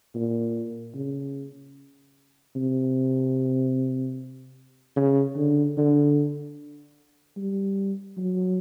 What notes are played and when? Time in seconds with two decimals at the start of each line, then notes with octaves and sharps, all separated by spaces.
0.15 A#2
0.95 C#3
2.56 C3
4.96 C#3
5.36 D3
5.77 D3
7.37 G3
8.17 F#3